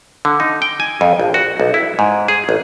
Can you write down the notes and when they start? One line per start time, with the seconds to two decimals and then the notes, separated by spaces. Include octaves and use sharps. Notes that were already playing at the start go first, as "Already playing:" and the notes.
0.25 D3
0.40 D#4
0.62 G5
0.80 G#5
1.01 F2
1.20 A#1
1.34 F#4
1.60 B1
1.74 E4
1.99 G#2
2.28 G#4
2.49 A1